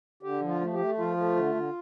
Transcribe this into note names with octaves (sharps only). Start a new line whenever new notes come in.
D3 G4
F3
F4
A3
G4
A3
F3 F4
A3
D3
D3